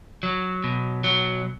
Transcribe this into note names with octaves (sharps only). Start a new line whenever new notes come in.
F#3
B2
F#3